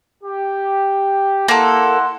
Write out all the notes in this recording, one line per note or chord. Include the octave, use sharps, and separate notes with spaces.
G4
A#3 E4 A4 F#5 C6